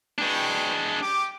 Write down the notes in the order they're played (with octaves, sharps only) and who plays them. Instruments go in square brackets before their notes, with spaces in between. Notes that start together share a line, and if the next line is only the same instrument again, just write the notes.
[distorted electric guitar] G#3 D4 [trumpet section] F#4 B4 G5
[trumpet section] G4 D6